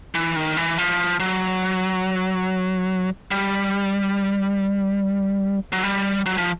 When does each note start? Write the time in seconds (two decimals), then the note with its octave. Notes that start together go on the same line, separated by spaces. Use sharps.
0.15 E3
0.36 D#3
0.57 E3
0.78 F3
1.20 F#3
3.31 G3
5.72 F#3
5.83 G3
6.26 F#3
6.38 F3